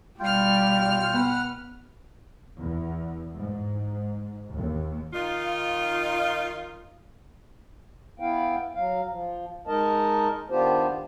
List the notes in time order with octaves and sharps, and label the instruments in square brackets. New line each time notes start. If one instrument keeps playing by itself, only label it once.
[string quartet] B2 F6 [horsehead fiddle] G3 [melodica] F4 G5
[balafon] B3 [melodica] B4 F#5
[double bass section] E2
G#2
D#2
[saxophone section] D#3 D#4 F4
[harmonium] B3 E4 F5 G5
F#3 F5
F3
G#3 D#4 A#4 D#5 A5
D#3 B3 D4 F4 G4 C5